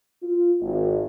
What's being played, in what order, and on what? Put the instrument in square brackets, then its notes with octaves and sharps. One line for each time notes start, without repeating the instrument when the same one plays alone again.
[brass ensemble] F4
G#1